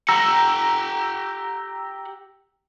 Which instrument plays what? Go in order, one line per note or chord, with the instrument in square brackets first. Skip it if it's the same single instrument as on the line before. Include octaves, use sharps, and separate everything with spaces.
[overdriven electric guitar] G4 F#5 [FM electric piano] A#5 E6 A#6